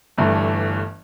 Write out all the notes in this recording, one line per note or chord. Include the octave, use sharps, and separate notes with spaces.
G1 G2 E3 A3